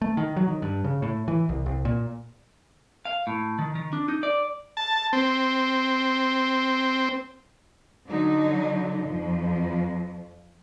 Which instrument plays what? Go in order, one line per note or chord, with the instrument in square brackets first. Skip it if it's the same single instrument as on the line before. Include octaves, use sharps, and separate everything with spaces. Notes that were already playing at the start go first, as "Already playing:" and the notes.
[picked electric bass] A3
D#3
F#3
D#3
G2
C#3
A2
E3
C2
C2
A#2
[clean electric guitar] F5
A2
D#3
D#3
D4
D#4
D5
[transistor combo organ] A5
C4
[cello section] D3 F#3 D#4
F2 F3